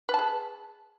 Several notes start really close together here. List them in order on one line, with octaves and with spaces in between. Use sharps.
B4 A5 G#4